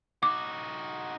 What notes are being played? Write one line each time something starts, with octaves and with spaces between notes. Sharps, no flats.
D#4 F#4 D6